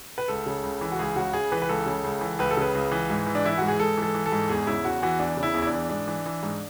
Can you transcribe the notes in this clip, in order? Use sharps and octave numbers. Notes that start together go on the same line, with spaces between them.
B4
C#2 A4
C#3
C#2
E3
F#4
C#2 G#4
C#3 F#4
C#2 G#4
E3 B4
B4
C#2 A4
C#3
C#2
E3
C#2 B4
A4
C#3 B4
C#2
E3
G#2
E3
D4
E3 E4
G#2 F#4
G#4
G#2 A4
E3
A4
E3
A4
G#2
E2 G#4
C#3 E4
E2 F#4
E3 F#4
E2 D4
C#3
E4
E2
E4
D4
E3
G#2 D4
E3
E3
G#2